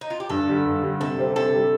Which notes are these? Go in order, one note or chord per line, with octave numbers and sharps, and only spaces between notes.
D#4
F4
G4
G2 A4
D3 G3
G2
D3 G3
C3 A4
G3 C4 G4
C3 A4
G3 C4 G4